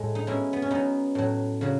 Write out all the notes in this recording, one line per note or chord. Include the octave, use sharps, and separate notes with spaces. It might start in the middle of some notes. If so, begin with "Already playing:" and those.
Already playing: A2 G#3
D#4
B2 G#3 C#4 E4
B3
C#4
B2 F#3 B3 D#4
A2 F#3
C#3 F#3